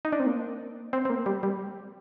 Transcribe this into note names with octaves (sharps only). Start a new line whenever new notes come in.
D#4
D4
C4
A#3
C4
C4
A#3
G3
G3